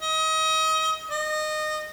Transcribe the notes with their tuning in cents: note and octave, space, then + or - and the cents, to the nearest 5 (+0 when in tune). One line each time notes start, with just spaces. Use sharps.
D#5 +30
D#5 -20